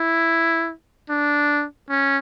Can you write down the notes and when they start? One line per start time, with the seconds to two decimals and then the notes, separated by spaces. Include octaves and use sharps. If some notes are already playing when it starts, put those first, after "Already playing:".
Already playing: E4
1.09 D4
1.89 C#4